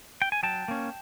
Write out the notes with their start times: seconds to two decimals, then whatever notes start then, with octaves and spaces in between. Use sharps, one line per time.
0.22 G5
0.32 G#5
0.43 F#3 G5 A5
0.68 A#3 C#4